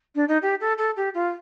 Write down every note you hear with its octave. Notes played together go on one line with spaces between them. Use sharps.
D4
D#4
G4
A4
A4
G4
F4